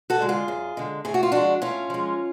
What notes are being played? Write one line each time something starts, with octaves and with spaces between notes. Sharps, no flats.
F#4 A4
D3 G#3
F4 G#4
F#2
D3 G#3
A2 G#4
F#4
F4
F3 G#3 D4 F#4
A2 C#4 F4
F3 G#3